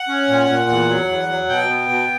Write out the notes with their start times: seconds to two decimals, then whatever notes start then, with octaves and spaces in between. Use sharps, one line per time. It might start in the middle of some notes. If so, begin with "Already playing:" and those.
Already playing: F#5
0.08 C#4
0.28 A#2
0.49 A#2
0.69 E2
0.89 F#3
1.09 E2
1.29 F#3
1.49 B2 G5
1.69 B3
1.89 B2